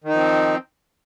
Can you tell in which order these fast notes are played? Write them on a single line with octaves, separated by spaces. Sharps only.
D#3 D#4 F3 C4